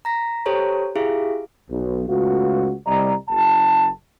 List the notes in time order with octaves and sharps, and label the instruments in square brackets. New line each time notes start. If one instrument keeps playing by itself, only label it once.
[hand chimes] A#5 A#6 B6
G4 A4 C5 C#5 A5 A#5
E4 F4 G4 G#4 E5 F5
[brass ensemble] B1
C#2 A3 B3 F4 F#4
C2 G3 D5 D#5 A#5
F#1 A5